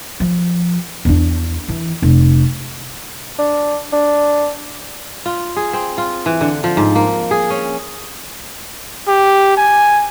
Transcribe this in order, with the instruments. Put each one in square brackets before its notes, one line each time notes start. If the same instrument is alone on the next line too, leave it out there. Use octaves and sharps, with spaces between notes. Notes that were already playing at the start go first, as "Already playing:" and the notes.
[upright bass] F3
E2 D4
E3
F1
[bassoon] D4
D4
[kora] F4
G#4
C4
F4
E3
D3
F3
G#2
A#3
G#4
C#4
[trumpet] G4
G#5